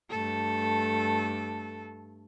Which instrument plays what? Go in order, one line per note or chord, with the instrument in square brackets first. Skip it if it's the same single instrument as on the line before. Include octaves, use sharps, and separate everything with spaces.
[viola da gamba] G2 A3 A4